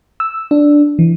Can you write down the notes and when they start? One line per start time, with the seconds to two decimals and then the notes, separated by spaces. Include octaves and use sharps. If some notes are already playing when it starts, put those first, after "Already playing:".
0.20 E6
0.51 D4
0.99 E3